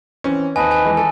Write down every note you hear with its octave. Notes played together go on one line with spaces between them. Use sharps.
E3 C4 C#4
D#2 C4 B4 D#5 G#5 A5
G#5
E3 G#3
A4 G#5